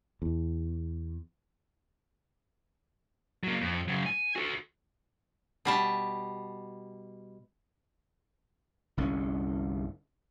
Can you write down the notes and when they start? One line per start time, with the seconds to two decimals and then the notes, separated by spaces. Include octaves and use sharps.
0.22 E2
3.44 F#3 A#3
3.62 F2
3.88 C#3 F#3
4.06 G#5
4.36 F#4 A4
5.65 B2 G3 A5
8.97 G1 C2 D3 C#4